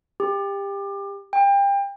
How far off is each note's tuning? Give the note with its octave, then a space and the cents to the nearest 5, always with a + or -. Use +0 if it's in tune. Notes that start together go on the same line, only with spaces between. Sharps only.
G4 +25
G5 +30